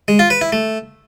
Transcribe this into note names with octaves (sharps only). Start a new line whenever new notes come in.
G#3
F4
B4
E4
A3